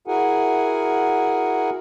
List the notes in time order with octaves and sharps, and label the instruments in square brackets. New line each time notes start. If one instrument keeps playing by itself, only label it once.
[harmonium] E4 F#4 G#4 A#4 F#5 G#5